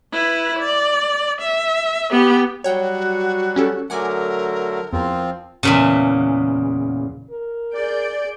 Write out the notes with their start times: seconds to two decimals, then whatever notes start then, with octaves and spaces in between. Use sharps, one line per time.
0.12 E4 B4
0.59 D5
1.41 E5
2.11 B3 G4
2.64 F#3 G3 F#4 C#5 G5
3.56 C#4 G4 A4
3.90 D3 F#3 A3 A#4 F#5 G#5 D6
4.93 E2 F3 C4 F4
5.63 E2 A#2 C#3
7.31 A#4
7.74 G#4 D5 G6 D7